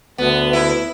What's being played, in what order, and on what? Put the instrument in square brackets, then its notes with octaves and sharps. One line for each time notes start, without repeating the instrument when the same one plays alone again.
[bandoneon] D2 [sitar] B3
[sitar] E4